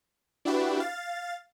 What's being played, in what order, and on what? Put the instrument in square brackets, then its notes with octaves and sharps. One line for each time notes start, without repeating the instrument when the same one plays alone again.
[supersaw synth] D4 E4 F#4 G4 B4
F5 A6